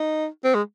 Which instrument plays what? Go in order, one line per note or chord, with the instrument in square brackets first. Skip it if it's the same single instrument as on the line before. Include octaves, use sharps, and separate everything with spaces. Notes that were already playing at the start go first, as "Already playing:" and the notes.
Already playing: [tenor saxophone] D#4
C4
G#3